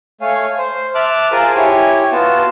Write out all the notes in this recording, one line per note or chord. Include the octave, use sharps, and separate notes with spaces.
A3 C#5 F5 G#5
C5
E5 A5 D6 F6 F#6
F4 G#4 A#4 C5 G#5 A5
E4 G4 C#5 G#5
B3 F4 F#4 A5